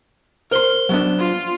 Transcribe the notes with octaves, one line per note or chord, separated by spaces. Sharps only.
A#4 C5 C6 G7
F#3 B3 D4
F4